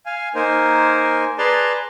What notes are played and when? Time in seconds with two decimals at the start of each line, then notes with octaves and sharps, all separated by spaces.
0.06 F5 G#5
0.35 A#3 D#4 A#4 C5 G#5
1.38 G#4 B4 D5 A5 A#5 C6